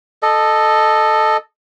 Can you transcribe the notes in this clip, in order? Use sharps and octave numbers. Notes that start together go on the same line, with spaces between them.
A4 D#5